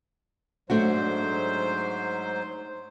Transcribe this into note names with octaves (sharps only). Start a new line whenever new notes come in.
G#2 F#3 A3 D4 F#4 C5